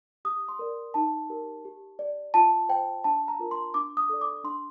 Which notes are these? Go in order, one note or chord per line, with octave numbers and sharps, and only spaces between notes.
G4 D#6
C6
A#4 D5
D#4 A5
G4 A#4
G4
D5
F4 A5
C5 G5
D4 A5
A#5
F4 A#4
C6
D4 D6
D#6
A4 D5
D6
D4 C6